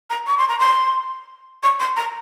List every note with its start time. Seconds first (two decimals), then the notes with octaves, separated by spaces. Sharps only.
0.09 A#5
0.27 C#6
0.37 C6
0.48 A#5
0.58 C6
1.62 C#6
1.79 C6
1.96 A#5